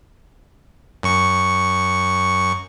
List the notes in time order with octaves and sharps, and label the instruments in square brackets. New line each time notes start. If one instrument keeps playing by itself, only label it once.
[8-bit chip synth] F#2 C#6